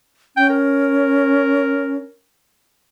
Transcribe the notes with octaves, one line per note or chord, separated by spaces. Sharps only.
C#4 G5
A#4